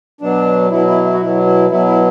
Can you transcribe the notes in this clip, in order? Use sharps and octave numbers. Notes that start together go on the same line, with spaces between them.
B2 F#3 D4
B2 F#3 E4
E4
E4
F#4
B2 F#3 E4
E4
B2 F#3 E4
E4